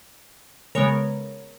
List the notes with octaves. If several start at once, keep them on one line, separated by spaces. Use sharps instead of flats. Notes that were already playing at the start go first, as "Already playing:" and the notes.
C#3 G#3 B3 A#4 C#5